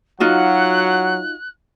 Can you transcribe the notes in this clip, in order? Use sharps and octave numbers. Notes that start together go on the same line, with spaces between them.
F#3 D#4 F4 F#4 F#5 F#6